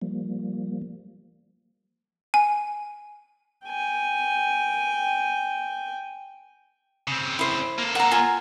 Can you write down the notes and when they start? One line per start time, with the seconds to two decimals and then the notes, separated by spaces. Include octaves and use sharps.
0.02 F3 G3 A#3
2.34 G#5
3.65 G5 G#5
7.08 C#3 C4
7.39 E4 C5
7.78 A#3 A4
7.95 F#5 A#5
8.12 F4 G#5 A#5